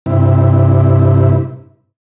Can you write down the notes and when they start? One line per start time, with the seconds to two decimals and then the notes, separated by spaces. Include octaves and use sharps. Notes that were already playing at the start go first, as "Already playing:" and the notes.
0.06 G2 C3 E4